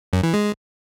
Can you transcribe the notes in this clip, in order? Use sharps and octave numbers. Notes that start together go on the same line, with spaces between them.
F#2
E3
G#3